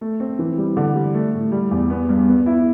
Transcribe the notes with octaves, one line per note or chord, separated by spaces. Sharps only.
A3
C4
E3
G3
D3
G3
A3
A2
G3
E2
B3
G2
B3
E4